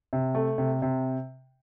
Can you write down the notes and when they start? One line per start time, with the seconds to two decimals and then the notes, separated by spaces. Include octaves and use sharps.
0.13 C3
0.35 A3
0.58 C3
0.82 C3